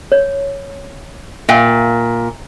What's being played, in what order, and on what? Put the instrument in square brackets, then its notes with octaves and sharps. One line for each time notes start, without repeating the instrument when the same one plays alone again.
[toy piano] C#5
[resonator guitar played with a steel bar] A#2 [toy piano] E5 F5 G5